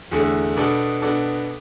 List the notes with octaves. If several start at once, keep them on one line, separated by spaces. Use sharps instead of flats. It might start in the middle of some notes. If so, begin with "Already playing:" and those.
E2 D3 A3
B2 B3 D4 A4
B2 B3 D4 A4